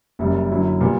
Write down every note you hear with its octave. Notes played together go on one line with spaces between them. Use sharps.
F#1 F#2 C#3 G3
F#2 D3 F#3 C#4 E4
A#2 G3 B3